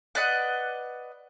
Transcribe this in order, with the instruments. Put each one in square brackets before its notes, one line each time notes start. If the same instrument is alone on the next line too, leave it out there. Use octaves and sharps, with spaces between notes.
[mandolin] B4 D5 D#5 F#5